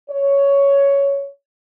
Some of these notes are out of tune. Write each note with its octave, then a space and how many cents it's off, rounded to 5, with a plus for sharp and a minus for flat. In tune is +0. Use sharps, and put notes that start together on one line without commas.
C#5 +10